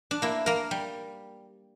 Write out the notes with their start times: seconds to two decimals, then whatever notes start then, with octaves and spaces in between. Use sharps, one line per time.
0.11 D4
0.22 A#3 E4
0.46 A#3 A#4
0.71 G3